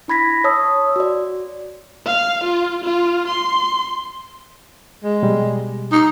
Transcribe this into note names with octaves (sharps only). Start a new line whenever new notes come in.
D4 E4 B5 G#6 A#6 B6
C#5 A5 D#6 E6
F#4 D5
F5
F4
F4
C6
G#3
B2 G3
D#4